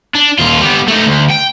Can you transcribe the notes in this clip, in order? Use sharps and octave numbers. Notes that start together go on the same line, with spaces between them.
D4
D#2 F4
G3 B3
A3 D#4
D2
G5